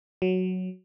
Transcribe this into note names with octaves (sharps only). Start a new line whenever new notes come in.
F#3